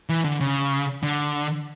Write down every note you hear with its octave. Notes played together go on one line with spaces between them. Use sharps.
E3
D3
C#3
D3